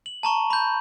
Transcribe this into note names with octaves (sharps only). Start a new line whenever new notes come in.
F#7
A5 A#5 C#6
B5 G6